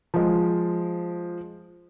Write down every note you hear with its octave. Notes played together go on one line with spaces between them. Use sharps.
F3 G#3